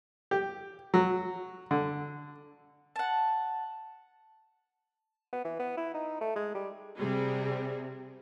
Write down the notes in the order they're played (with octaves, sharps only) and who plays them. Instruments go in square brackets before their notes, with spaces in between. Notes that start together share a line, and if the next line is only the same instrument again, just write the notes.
[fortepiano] G4
F#3
D3
[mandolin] F#5 A5
[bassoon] B3
E3
B3
E4
D#4
A3
G#3
G3
[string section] C3 [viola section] G3 G#4